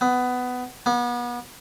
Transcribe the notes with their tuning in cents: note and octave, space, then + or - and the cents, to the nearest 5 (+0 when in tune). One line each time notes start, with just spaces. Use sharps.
B3 +15
B3 -35